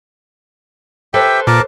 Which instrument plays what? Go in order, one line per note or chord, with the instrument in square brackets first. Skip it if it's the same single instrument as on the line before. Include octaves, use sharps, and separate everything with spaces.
[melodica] G4 E5 G5 [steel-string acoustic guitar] A4 B4 C5
[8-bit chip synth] A#2 [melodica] A#4 A5 D6